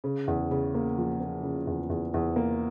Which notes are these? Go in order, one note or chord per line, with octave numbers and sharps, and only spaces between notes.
C#3
E2
C#3
A#3
F3
A#3
C#3
E2
E2
E2
A#3